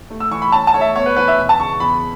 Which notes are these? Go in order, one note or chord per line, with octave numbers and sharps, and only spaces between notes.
A3
E6
E3 C#6
B5
C#4 A5
A5
A3 C#5
E5
B3 C#5
B4
E3 B4
E5
E1
A5
C#3 C#6
E2 B5